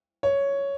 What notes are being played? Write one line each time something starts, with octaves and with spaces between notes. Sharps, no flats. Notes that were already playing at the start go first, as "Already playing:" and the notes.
C#5